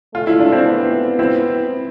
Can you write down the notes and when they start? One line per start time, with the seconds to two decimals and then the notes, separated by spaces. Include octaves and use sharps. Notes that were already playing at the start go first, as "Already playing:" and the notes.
0.14 A3 F4
0.27 E4
0.40 D4
0.52 C4 E4
0.67 B3
1.19 C4 E4